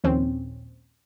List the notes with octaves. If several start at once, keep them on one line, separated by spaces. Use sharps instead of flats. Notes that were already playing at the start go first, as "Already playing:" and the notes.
A#1 D#2 C4 C#4